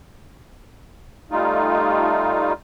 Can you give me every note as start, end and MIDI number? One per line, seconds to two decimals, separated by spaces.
1.31 2.53 55
1.31 2.53 57
1.31 2.53 63
1.31 2.53 65